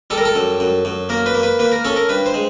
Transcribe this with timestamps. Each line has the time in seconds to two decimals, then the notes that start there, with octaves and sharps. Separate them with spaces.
0.10 G3 A4
0.18 A#4
0.25 A4
0.35 F#2
0.60 F#2
0.85 F#2
1.09 A#3 A#4
1.26 B4
1.34 A#3
1.43 B4
1.59 A#3 B4
1.72 A#4
1.85 C#4 A4
1.96 A#4
2.09 G2 B4
2.26 C5
2.34 G#3